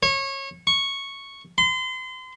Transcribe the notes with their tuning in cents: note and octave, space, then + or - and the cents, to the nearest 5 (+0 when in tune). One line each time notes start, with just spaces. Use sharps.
C#5 -25
C#6 -5
C6 -35